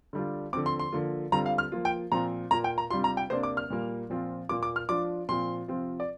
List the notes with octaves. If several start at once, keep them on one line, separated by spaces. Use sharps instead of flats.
D3 G3 D4 F4
D3 F3 C4 D6
C6
C6
D3 F3 A#3 F4
D3 G3 C4 F4 A#5
F5
F6
F3 A#3 F4
G5
A#2 F3 C4 F4 A#5
A#2 A#3 F4 A#5
G5
A#5
C3 G3 D4 F4 C6
A#5
G5
C3 A#3 D4 C5
D6
F6
A#2 G3 A#3
A#2 F3 C4 F4
A#2 A#3 F4 D6
D6
F6
F3 D4 F4 D6
A#2 F3 C4 F4 C6
C3 F3 C4 F4
D5